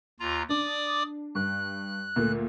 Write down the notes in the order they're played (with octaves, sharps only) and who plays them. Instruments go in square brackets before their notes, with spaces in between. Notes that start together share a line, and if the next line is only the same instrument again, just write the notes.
[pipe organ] D#2 F4 A#5
[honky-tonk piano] D4 [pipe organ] D5 D6 D#6
[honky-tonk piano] G2 [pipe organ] F#6
[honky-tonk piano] D2 A#2